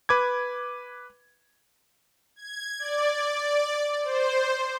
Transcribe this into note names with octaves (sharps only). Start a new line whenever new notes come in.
B4 D6 G#6
G#6
D5
C5